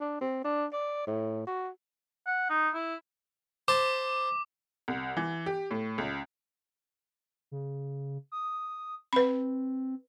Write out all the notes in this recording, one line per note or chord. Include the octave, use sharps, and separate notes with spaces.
D4
C4
D4
D5
A2
F#4
F#5
D#4
E4
C5 A5 D6
C2
E3
G4
A2
C#2
C#3
D#6
C4 B4 B5